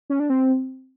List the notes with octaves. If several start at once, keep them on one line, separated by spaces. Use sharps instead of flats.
C#4
D4
C4